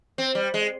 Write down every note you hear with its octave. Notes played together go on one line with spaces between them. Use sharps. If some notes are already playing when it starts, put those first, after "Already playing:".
C4
G3
G#3